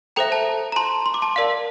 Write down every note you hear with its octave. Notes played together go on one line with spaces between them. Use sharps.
A4 C5 E5 G5 A#5
A5
A#5
A5 C6
C6
D6
A5 C6
A#4 D5 F5